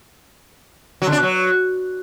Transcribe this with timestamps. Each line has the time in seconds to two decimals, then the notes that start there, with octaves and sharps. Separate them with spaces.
1.02 F#3
1.07 D3
1.12 D4
1.17 B2
1.23 F#3